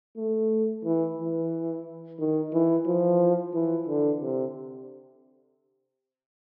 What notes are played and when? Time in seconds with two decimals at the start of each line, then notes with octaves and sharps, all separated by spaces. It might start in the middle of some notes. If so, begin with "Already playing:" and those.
0.17 A3
0.85 E3
1.19 E3
2.19 D#3
2.53 E3
2.86 F3
3.54 E3
3.87 D3
4.21 C3